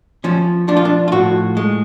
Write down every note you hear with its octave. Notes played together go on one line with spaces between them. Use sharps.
F3 C#4
F3 D4
F4
D4
F4
A2 F#4
G#3